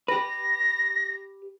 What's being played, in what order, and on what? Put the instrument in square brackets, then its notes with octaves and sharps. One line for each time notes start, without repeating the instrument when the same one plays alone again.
[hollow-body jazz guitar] G4 B4 [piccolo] A#6